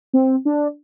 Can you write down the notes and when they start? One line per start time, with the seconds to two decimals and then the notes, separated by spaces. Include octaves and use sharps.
0.14 C4
0.45 D4